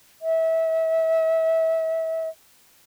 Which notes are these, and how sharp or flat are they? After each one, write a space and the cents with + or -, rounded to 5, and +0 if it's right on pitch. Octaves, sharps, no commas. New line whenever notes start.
E5 -30